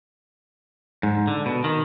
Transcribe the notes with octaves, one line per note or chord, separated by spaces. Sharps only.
G#2
D3
B2
D#3